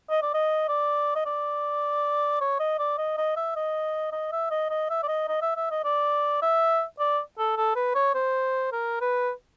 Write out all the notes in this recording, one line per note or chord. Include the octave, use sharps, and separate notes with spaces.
D#5
D5
D#5
D5
D#5
D5
C#5
D#5
D5
D#5
D#5
E5
D#5
D#5
E5
D#5
D#5
E5
D5
D#5
D#5
E5
E5
D#5
D5
E5
D5
A4
A4
B4
C#5
C5
A#4
B4